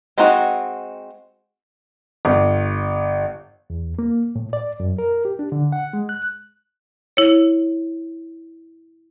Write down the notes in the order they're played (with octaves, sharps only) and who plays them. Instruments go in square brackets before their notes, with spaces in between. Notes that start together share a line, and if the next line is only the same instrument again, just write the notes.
[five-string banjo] G#3 C4 D#4 F#4
[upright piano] G1
[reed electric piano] E2
A#3
A2
D5
F#2
A#4
G4
D4
D3
F#5
G#3
F#6
[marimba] E4 C#5